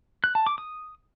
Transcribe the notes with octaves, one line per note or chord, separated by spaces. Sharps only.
F#6
A5
D6
D#6